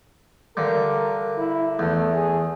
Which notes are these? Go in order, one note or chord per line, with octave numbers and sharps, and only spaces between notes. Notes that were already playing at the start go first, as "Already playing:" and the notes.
G2 D3 A#4
E4
E2 A3
G#4